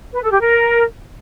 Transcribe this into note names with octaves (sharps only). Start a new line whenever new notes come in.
B4
A4
G4
A#4